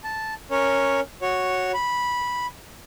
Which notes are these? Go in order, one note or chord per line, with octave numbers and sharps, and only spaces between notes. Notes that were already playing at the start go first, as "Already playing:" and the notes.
A5
C#4 A#4 C#5
F#4 C#5
B5